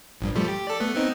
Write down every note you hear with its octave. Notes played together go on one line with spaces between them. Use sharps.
A#1 G2
F3 G3 A3
G4
A4 D5
A3 B3
B3 C4 D#4